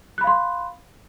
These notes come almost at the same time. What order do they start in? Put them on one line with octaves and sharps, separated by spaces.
F#6 B5 F5 C6